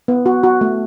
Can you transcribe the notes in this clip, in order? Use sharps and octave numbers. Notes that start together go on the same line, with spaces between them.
B3
F#4
F#4
A3